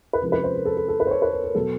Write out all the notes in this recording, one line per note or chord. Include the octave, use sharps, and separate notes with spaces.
B4
C3 F3 G#3 C#4 A#4
B4
C5
A#4
A4
A4
A4
B4
C5
C#5
B4
A#4
A#4
B2 F#3 B3 A4